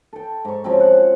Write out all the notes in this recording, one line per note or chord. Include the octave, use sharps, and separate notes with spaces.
A4 G5
G#2 C#6
C#3 F3 F#3 C4
F#5